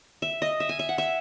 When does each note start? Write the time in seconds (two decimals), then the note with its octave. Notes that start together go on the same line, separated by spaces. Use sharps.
0.22 E5
0.42 D#5
0.60 E5
0.69 G#5
0.79 E5
0.89 F#5
0.98 E5